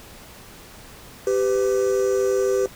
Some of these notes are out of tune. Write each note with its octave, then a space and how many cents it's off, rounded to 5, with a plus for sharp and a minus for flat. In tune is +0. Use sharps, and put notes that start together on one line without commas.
G4 +0 B4 +35